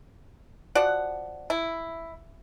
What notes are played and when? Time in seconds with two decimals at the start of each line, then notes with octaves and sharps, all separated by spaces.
0.75 F3 F#4 D5 F#5
1.50 E4